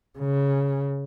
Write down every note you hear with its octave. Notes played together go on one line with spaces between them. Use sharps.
C#3